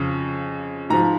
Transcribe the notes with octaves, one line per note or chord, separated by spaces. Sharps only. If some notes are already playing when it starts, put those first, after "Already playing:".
Already playing: F2 C#3 F3
G#2 F3 A#5